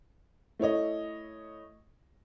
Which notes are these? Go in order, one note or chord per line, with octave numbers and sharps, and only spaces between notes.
A3 E4 C#5 D#5